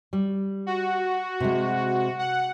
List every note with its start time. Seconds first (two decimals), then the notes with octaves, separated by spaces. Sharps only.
0.13 G3
0.66 F#4
1.40 C3 G#3
2.19 F#5